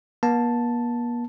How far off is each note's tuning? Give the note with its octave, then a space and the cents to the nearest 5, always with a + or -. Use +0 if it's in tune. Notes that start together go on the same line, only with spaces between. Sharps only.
A#3 +45 A5 +0